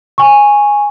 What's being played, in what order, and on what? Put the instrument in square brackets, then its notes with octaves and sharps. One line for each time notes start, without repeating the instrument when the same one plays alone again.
[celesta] G#5 C#6